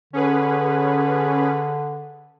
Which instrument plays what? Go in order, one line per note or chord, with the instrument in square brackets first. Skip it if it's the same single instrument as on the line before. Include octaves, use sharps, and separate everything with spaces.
[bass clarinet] D3 [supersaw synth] C#4 G#4 B4